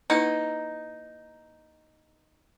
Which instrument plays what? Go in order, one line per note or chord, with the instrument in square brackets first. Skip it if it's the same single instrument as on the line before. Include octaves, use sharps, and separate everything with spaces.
[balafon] A#3 E4 B4 [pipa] D#4